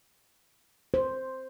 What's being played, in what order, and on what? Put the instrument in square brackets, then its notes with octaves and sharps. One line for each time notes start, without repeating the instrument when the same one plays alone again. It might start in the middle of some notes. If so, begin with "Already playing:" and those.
[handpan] C5